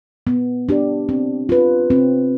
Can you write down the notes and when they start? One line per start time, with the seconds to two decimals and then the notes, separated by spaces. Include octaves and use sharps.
0.27 B3
0.69 D4 G4 D5
1.09 C4
1.49 F4 B4
1.90 C4